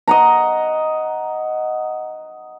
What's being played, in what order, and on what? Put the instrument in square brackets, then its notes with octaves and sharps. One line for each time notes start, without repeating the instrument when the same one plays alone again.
[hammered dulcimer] D#5 F#5 A#5